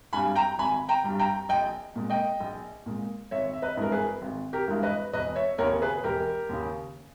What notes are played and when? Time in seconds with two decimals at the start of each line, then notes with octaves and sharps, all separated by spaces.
0.13 G2 G3 G#5 B5
0.35 G5 A#5
0.58 G#1 G#5 B5
0.89 G5 A#5
1.04 G2 G3
1.19 G5 A#5
1.49 A#1 D#5 G5
1.96 A#2 G#3
2.10 D#5 G5
2.40 A#1
2.86 A#2 G#3
3.31 G#1 C#5 E5
3.53 E5
3.62 B4 D#5
3.77 G2 E3 G#3 A#4
3.92 G#4 B4
4.22 G#1
4.53 G4 A#4
4.68 G2 E3 G#3
4.83 B4 D#5
5.13 E1 B4 D#5
5.36 C#5 E5
5.58 D#2 A#4 C#5
5.62 C#3
5.82 G#4 B4
6.04 E1 G4 A#4
6.49 D#2 C#3